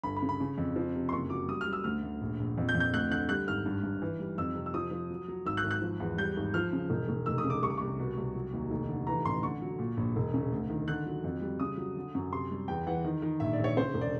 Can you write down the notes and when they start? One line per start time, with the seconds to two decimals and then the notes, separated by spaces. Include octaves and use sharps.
0.03 G1 B5
0.16 B5
0.22 C#3
0.29 B5
0.40 C#3
0.58 F2
0.76 F3
0.95 C3
1.09 C6
1.12 F#1 C#6
1.30 F#3 D6
1.48 G3 D#6
1.61 F6
1.67 G3
1.73 E6
1.84 D2 F6
2.03 D2
2.21 A#1
2.39 A#1
2.58 F2
2.69 G6
2.75 F2
2.80 G6
2.94 D2 F#6
3.11 D3 F#6
3.29 G3 F#6
3.47 G#1 F6
3.66 G2
3.83 G2
4.02 E3
4.19 G3
4.38 F2 E6
4.55 C3
4.66 E6
4.74 F3 D#6
4.91 F3
5.10 F#3
5.28 F#3
5.46 G#1 E6
5.57 F#6
5.64 G#1
5.71 F#6
5.82 F3
6.00 E2
6.18 G3 G6
6.36 G#1
6.54 F3 F6
6.73 C#3
6.90 E1
7.09 E1
7.26 F1 E6
7.38 D#6
7.44 C#3
7.50 D6
7.62 C2 C#6
7.70 D6
7.78 C2 C#6
7.99 B2
8.17 C2
8.35 F#3
8.53 D#2
8.71 F1
8.89 D3
9.07 E3 A#5
9.25 A1 C6
9.43 D3 C#6
9.62 F#3
9.79 A#2
9.97 A#1
10.16 E1
10.34 C#3
10.52 D2
10.70 D#3
10.88 D3 F#6
11.06 F#3
11.24 F2
11.41 G3
11.60 C#3 D#6
11.77 F#3
11.96 D3
12.15 F#2
12.32 C3 C6
12.51 G3
12.68 E2 G5
12.87 E3 F#5
13.05 D#3
13.22 D#3
13.40 A#1 E5
13.53 D5
13.59 A#1
13.64 C#5
13.77 C#3 C5
13.94 E1
14.01 D5